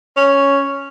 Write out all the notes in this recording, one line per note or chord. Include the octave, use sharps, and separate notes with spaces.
C#4